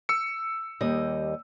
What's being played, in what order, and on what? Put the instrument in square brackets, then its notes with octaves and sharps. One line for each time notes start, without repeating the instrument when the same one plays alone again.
[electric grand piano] E6 C#7
[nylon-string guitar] D#2 G3 D#5